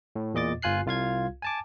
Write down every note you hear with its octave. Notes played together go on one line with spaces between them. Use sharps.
A2
E2 A#2 D#5 D6 A6
G1 F4 G#5 F#6 C7
C2 F4 F5 G#6
G#5 A5 D6